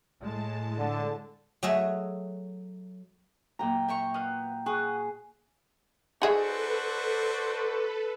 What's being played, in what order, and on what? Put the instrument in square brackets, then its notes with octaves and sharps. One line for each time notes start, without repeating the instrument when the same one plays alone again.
[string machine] A2 A5 [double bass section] G#3
[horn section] D3
[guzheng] F#3 A3 F#4 G#4 D#5 E5
[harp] F#2 A#2 [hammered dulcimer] G5 A#5
[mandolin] E5 A#5 C#6 [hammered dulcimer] G5
[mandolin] B3 [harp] D#5 F5
[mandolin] F#4 D#6 [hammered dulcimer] G#4
[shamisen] D#4 G#4 E5 [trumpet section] F#4 C5 D5 [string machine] A4 B4